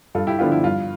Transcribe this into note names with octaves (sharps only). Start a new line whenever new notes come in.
G2 F4 A4
E4 G4
D3 F3 B3 D4 F4
E4
G2 F4